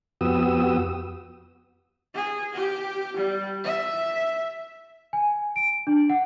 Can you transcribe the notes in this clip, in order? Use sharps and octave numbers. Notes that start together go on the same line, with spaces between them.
F2 B3 F#4 G4 D#6 E6
G#4
G4
G3
E5
G#5
D7
D4
F#5